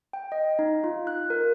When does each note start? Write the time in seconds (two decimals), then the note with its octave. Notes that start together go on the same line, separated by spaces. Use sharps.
0.13 G5
0.32 D#5
0.59 D#4
0.84 F4
1.07 F#6
1.30 A#4